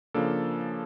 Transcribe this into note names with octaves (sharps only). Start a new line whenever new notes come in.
C#3 F3 A#3 D4 A4